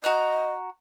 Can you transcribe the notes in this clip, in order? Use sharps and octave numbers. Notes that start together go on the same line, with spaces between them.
F#4 D#5 A#5 F#6